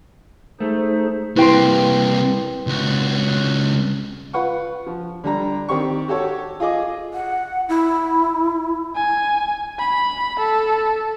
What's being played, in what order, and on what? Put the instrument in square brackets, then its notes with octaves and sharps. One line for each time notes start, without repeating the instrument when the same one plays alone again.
[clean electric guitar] A3 [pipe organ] D#4 G#4 C5
[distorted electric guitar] C2 A#3 [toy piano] E4 G4 C#6 [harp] B4 G5 C6
[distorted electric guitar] C#2 F#4
[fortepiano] F4 B4 F#5 C#6
F3
D3 G3 A#5
D#3 C4 G4 C#6
F#4 G4 A4 C#5
F4 G#4 D#5 D6
[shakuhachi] F#5
E4
[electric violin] G#5
B5
A4